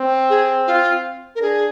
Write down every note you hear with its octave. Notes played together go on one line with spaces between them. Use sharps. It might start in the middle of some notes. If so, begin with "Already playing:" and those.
Already playing: C4
G#4
F4
A#4
D4 G#4